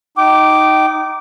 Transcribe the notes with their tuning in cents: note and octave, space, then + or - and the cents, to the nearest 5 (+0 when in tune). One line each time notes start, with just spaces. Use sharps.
D#4 +0 G5 -30 D6 +0